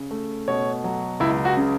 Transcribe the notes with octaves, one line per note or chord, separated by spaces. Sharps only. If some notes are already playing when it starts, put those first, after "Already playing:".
Already playing: C#3
A3
B2 C#5
F#3
C#2 E4
F#4
C#3